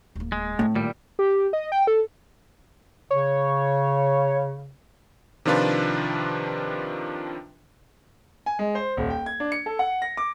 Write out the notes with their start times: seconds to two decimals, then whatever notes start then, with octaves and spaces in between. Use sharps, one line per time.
0.16 D1 A#3
0.32 G#3
0.59 A2 A3 C4
0.75 A#2 D#3 G3
1.19 G4
1.53 D#5
1.72 G5
1.87 A4
3.11 C#3 C#5
5.45 C3 D#3 F3 D4 F4 B4
8.46 G#5
8.59 G#3
8.75 C5
8.97 D#1
9.10 G5
9.26 G#6
9.40 D4
9.52 C#7
9.66 A4
9.79 F#5
10.02 A#6
10.17 D6